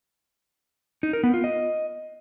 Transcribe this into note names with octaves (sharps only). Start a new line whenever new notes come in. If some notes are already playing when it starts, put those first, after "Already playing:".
D#4
A#4
B3
F4
D#5